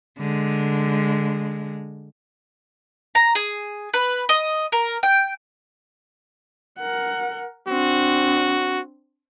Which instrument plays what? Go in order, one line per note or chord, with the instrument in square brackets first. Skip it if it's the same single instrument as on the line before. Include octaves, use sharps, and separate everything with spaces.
[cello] D3 G#3
[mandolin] A#5
G#4
B4
D#5
A#4
G5
[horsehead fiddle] A#4 F#5
[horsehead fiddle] C4 D4 [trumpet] F#4